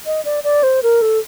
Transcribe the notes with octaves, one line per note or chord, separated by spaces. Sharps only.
D#5
D5
D5
C5
A#4
A4